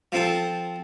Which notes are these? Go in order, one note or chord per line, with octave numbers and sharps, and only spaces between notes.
F3 C4 A4